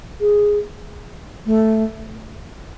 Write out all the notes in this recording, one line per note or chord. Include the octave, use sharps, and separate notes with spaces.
G#4
A3